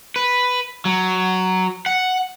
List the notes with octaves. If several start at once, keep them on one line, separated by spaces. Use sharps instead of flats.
B4
F#3
F#5